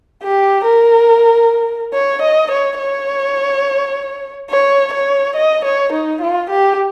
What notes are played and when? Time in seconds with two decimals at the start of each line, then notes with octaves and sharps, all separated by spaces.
0.23 G4
0.65 A#4
1.93 C#5
2.22 D#5
2.51 C#5
2.79 C#5
4.50 C#5
4.93 C#5
5.36 D#5
5.65 C#5
5.92 D#4
6.21 F4
6.50 G4